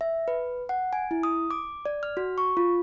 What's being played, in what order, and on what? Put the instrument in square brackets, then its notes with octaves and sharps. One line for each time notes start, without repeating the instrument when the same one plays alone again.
[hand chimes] E5
B4
F#5
G#5
E4
D#6
D6
D5
F6
F#4
C#6
F4